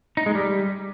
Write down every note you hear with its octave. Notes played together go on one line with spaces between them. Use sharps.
D#4
G#3
G3